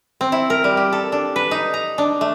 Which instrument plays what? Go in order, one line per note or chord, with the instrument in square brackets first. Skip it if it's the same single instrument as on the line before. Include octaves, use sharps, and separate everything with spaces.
[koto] C4
E4
A#4
G3
G4
A4
D4
B4
D#4
A#5
D4
A3